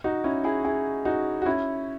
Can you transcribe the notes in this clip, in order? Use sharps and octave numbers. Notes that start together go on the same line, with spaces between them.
D#4 F#4
C#4 E4
E4 G#4
E4 G#4
D#4 F#4
F#4
C#4 E4